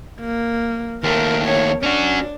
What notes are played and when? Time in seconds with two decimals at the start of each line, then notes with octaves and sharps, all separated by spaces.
0.21 A#3
1.03 D#2 A3 A#4
1.46 C#5
1.83 C#4 D4 F#4